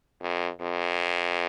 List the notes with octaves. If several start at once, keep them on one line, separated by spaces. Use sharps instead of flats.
F2
F2